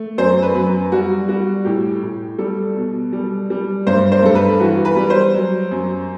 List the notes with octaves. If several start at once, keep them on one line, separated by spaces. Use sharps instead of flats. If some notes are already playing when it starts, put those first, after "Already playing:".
Already playing: A3
F#2 C5
B4
F#2
G3 F#4
G3 F#4
A2 G4
A2
G3 A4
B2
G3
G3
G2 C5
C5
G2 A4
B4
E3 F#4
B4
G3
C5
F#3
F#2